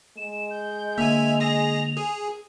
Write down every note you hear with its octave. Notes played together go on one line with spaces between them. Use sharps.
G#3 E7
G6
D3 A#3 E5 G#5 F7
G#4 A#6
G#4